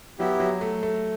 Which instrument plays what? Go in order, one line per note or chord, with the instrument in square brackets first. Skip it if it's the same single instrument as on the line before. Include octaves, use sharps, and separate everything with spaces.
[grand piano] F#3 [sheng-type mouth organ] B3 E4 G4
[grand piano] F#3
A3
A3